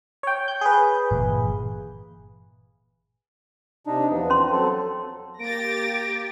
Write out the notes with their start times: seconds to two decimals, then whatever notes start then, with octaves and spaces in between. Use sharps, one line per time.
0.23 C#5 G5
0.48 G6
0.61 G#4 B4
1.11 G1 A#2 E3
3.87 C3 D4 D#4
4.11 E2 F3 B3
4.30 C#4 C6
4.52 F#3 C4 A4
5.40 A#3 G4 A6 A#6 D7